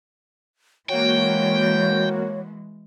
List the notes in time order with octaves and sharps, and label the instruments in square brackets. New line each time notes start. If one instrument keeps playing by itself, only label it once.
[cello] E3 G#3 [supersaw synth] A#3 F#4 [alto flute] C#5 [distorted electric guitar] G5